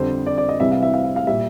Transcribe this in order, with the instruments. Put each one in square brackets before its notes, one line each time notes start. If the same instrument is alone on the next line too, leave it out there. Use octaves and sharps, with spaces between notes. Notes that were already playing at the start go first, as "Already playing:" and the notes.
Already playing: [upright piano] F2 D3 G3 C5
D5
D5
D#5
C2 C3 E3 G3 E5
F5
E5
F5
E5
F5
A#2 G3 E5